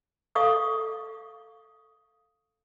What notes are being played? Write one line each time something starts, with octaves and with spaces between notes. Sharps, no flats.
A4 F5 C#6 D#6